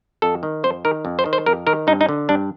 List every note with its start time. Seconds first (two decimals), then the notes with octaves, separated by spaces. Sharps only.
0.22 F2 A4
0.43 D#3
0.64 F2 C5
0.85 D#3 A#4
1.05 F2
1.19 C5
1.26 D#3
1.33 C5
1.46 F2 A#4
1.67 D#3 A#4
1.87 G2 D#4
2.01 D#4
2.09 D3
2.29 G2 D4